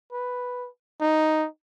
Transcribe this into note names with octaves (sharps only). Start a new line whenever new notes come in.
B4
D#4